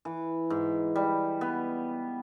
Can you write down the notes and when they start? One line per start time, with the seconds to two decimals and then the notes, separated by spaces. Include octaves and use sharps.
0.05 E3
0.50 G#2
0.95 G3
1.41 B3